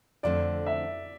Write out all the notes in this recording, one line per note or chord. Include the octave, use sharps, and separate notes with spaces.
F2 D3 A3 C4 D5
E5